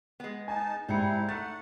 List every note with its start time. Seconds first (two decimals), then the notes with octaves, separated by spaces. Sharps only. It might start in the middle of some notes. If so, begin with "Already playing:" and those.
0.20 G#3 B3
0.48 D#4 G#5 A5
0.89 G#2 G3 C4 D#4 E4 G#4 C#7
1.29 A3 F#5 A6